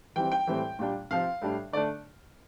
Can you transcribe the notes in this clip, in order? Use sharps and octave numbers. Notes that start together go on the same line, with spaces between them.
E3 G3 C4 G5
G5
A2 E3 G3 C4
A#2 G3 D4
C3 F3 C4 F5
A2 G3 D4
D3 A3 D4 D5